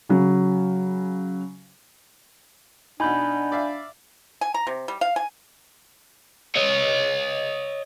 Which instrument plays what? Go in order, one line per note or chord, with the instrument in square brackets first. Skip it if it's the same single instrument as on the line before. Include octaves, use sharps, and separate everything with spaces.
[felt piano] C#3 F#3
[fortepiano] B2 D#4 [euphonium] D4 [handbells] G#5 B5 G6
[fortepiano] D5 E5 F5
[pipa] G#5
A#5
C3
G3
F5
G#5
[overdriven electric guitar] C#5 D#5